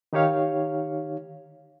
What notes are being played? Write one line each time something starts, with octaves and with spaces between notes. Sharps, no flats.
D#3 D#4 G4 C#5 F5